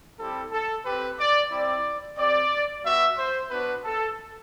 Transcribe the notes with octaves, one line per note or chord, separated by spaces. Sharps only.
G3 C4 E4 G4 A4
A4
C4 G4 B4
D5
G3 C4 E4 D5
C4 G4 D5
G3 B3 F#4 E5
C5
B3 D4 F#4 B4
A4